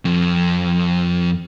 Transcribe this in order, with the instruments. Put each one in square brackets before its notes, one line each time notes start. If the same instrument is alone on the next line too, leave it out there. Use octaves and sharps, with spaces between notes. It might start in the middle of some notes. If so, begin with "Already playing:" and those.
[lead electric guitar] F2